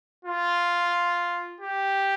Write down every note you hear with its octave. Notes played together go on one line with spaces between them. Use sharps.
F4
G4